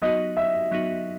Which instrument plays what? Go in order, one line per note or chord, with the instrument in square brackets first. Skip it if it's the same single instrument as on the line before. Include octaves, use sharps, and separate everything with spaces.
[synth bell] F#3 B3 D#4 F#4 [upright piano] D#5
[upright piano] E5
[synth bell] F#3 B3 D#4 F#4